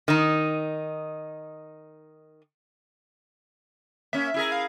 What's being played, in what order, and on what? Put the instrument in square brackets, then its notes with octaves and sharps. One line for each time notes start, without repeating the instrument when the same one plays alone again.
[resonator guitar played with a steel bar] D#3 D#4
[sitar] A#3 C#4 [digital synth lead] E5
[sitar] E4 G#4 A#4
[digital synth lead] F5